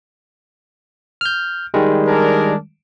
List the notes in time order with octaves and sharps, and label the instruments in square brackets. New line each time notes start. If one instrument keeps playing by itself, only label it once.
[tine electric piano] F6 G6
D#3 G3 G#3
[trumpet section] D4 G#4 A#4